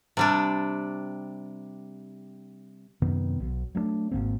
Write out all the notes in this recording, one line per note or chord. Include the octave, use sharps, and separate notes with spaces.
C3 G3 D4
F#2 C3 D#3 B3
B1
F#3 A3 B3 D4
G#1 F#2 A#3 C4